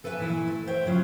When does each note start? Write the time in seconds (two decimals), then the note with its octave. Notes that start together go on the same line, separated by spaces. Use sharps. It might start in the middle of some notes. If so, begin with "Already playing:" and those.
0.04 A4 B4 C#5 E5 G5 G#5
0.19 A#2 E3 E4
0.48 A3
0.67 C5 C#5 E5 G5
0.86 C#3 F#3 F4